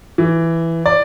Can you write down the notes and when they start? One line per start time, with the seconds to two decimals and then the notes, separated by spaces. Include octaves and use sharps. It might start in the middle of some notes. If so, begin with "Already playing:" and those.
0.18 E3
0.86 D5